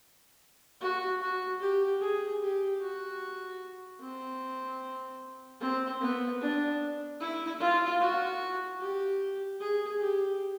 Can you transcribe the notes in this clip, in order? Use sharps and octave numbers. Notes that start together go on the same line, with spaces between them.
F#4
F#4
G4
G#4
G4
F#4
C4
C4
B3
D4
E4
F4
F#4
G4
G#4
G4